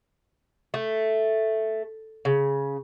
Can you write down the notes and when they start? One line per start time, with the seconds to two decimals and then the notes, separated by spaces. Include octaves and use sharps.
0.74 A3
2.25 C#3